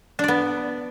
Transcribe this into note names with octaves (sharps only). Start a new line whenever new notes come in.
B3 D4 D5